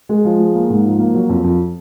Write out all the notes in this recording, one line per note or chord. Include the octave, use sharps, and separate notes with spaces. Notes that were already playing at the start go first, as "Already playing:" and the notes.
G#3
F3
G#3
A#3
G#2
F3
A#3
F#3
F2
F2